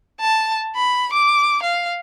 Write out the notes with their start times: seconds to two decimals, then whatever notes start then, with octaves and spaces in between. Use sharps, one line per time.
0.20 A5
0.76 B5
1.13 D6
1.63 F5